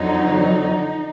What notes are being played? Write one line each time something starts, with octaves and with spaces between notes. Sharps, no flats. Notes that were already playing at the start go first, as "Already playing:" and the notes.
Already playing: F2 D3 F#3 D#4